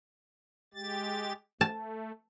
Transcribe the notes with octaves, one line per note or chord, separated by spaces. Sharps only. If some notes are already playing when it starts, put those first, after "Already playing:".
G#3 G4 A6
A3 A5